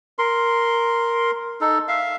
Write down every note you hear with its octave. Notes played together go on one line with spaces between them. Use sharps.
A#4 C6
D#4 A4
E5 F5